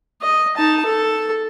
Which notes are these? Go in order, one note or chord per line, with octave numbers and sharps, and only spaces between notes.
D#5
D#4 A5
A4